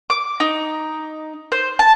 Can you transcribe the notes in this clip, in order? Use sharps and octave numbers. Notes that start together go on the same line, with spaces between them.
D6
D#4
C5
A5